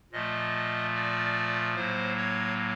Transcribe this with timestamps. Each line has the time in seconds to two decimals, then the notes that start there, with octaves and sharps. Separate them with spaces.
0.12 A#2 F3 A3 D#5
0.95 D5
1.76 A2 F#3 A#3 C5
2.17 C#5